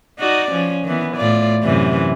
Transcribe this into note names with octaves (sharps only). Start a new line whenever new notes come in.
D#4 F#4 D5
F3 C#4
D#3 E3 B3
A2 F4 D5
F#2 C3 E3